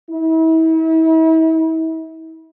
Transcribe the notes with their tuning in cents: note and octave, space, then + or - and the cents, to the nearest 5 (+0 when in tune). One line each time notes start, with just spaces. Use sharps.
E4 -40